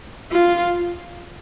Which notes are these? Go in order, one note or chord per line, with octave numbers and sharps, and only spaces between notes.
F4